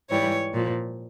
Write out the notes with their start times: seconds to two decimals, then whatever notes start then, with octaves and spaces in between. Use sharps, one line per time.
0.10 G#2 E3 G3 C#5
0.53 A#2 F3